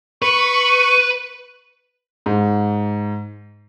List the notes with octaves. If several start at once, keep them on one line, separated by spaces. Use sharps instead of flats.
B4 C#6
G#2